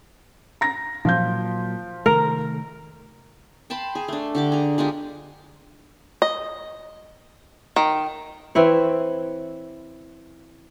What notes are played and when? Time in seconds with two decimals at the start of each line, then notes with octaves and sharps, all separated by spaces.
0.61 A#5 A#6
1.05 A#2 F3 F#3 F4 G6
2.06 C3 D#3 A3 A#4
3.70 G5 A5 B5 C6
3.95 G#4
4.08 A3 D4
4.35 D3 G4 D6
4.52 G#4 A#5
4.78 G#3 D4 F4 G4
6.22 D#5
7.76 D#3
8.55 E3 C4 E4 C#5